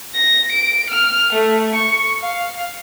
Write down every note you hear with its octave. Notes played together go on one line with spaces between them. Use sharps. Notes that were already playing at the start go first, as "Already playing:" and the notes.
A#6
D7
F6
A3
C#6
F5